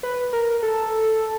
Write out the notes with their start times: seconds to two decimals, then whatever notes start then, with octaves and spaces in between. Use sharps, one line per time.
0.03 B4
0.33 A#4
0.63 A4